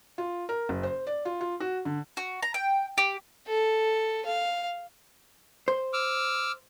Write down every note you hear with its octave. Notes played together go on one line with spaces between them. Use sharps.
F4
A#4
F#1
C5
D5
F4
F4
F#4
D3
F#4
A#5
G5
G4
A4
F5
C5
D6 E6 F6